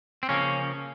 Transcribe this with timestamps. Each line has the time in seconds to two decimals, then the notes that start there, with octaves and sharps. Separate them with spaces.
0.23 C4
0.29 C#3 F3 A#3 C#4